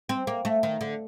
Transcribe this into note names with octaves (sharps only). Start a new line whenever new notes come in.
C4
A#3
A3
D#3
D3